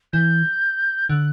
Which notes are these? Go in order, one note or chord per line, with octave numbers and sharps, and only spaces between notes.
E3 G6
D3 F#6